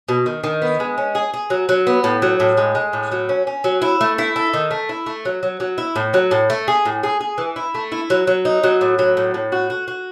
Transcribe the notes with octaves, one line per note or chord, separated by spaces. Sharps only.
B2
D#3
D#3
B3
G#3
C#4
G#4
G#4
F#3
F#3
B3
A2
F#3
A2
G#3
G#3
A2
F#3
C#4
C#4
F#3
E4
A3
E4
A4
D#3
A3
E4
A3
F#3
F#3
F#3
E4
A2
F#3
A2
A3
G#4
A2
G#4
G#4
E3
E4
A3
E4
F#3
F#3
D#4
F#3
A2
F#3
A2
A2
F#4
F#4
F#4